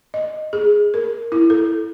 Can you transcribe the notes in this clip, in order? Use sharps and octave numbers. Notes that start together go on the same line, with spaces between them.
D#5
G#4
A#4
E4
A4